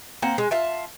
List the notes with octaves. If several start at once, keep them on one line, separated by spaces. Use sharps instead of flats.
A#3 C4 F#5
G#3
F4 E5 A5